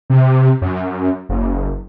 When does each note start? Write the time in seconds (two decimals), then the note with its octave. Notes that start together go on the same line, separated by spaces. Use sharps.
0.10 C3
0.62 F#2
1.29 F#1